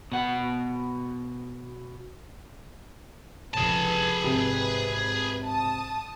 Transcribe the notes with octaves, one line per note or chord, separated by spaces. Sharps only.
B2 F#5
F1 C#2 G#4 B4 A5
G#1 C3
A5 D#6